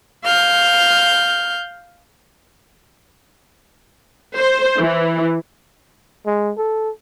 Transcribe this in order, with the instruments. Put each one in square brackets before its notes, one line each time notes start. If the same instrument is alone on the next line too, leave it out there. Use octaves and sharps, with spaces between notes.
[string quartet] F5 F6 G6
[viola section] C5
E3
[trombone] G#3
A4